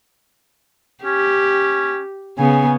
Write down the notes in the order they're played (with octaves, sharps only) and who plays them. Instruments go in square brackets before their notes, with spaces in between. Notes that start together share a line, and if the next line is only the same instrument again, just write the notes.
[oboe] C#4 [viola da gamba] G4
[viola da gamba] C#3 B3 [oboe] G#5